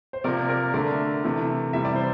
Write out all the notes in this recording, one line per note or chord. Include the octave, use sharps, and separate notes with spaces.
C5
C3 F3 A#3 A#4 D5
A#4 D5
D3 A3 A#4 D5
C3 E3 A3
C3 E3 G3 E5
D5
C5